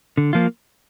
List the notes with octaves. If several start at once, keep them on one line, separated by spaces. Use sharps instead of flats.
D3
F3 A#3 F4